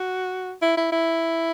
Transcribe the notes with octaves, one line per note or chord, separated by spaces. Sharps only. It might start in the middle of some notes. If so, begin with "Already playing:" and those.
Already playing: F#4
E4
E4
E4